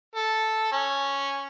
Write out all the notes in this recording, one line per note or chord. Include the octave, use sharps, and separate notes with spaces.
A4
C#4